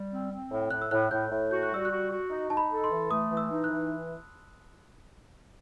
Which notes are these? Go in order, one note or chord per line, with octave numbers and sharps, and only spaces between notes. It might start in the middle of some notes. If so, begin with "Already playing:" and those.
Already playing: G3
C4
C4
A2
A2 F#6
E6
A2 F#6
A2 G6
A2
F#4 G6
F#6
G3 E6
F#6
F#4
F#4
D#4
D#4 A5
B5
A4
C6
E3
A3 D#6
E3
E6
D#4
F#6
E3